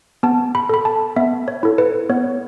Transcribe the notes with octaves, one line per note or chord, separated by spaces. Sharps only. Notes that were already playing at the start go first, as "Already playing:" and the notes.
B3 A5
B5
A4 B5
A5
B3 E5
C#5
E4 A4
B4
B3 C#5